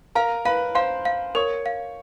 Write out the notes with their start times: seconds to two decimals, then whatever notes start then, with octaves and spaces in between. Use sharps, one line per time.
0.15 A#4 F5 A#5
0.45 B4 F5 B5
0.75 C5 F5 C6
1.05 F5
1.35 A#4 C#5 C#6
1.66 F5